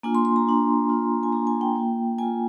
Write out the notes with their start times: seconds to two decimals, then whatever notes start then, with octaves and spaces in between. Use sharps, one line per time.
0.03 A#3 D4 F4 G#5
0.15 C6
0.25 C6
0.36 A#5
0.47 A#3 D4 F4
0.90 A#3 D4 F4
1.23 G#5
1.32 A#3 D4 F4 A#5
1.47 G#5
1.61 G5
1.76 A#3 F4
2.18 A#3 F4 G#5